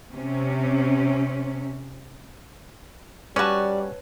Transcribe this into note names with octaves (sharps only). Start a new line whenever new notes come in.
C3 C#4
G3 C#4 F#4 B4 C#5 D5 A5 C#6